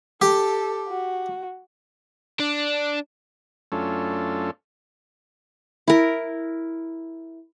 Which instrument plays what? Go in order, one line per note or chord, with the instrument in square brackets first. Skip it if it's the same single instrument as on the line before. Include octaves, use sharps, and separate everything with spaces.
[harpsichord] G4 [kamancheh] A4
[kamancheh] F#4
[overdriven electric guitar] D4
[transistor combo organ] F#2 A3 C#4 D4 F4 A4
[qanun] E4 A#4